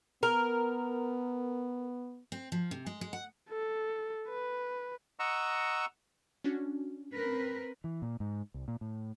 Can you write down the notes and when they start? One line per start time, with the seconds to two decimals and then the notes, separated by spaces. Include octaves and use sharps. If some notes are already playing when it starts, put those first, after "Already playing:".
0.23 B3 A#4
2.32 C4
2.52 F3
2.71 C3
2.86 G#3
3.01 G#3
3.13 F#5
3.50 A4
4.29 B4
5.19 D#5 F#5 A#5 C#6 E6
6.44 C#4 D4 F#4
7.13 C4 A#4 B4
7.84 E3
8.02 A#2
8.20 G#2
8.54 C2
8.68 A#2
8.81 A2